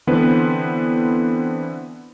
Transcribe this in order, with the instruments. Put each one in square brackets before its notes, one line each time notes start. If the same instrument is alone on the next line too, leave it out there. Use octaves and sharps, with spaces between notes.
[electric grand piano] D3 E3 B3 C4 B4 C5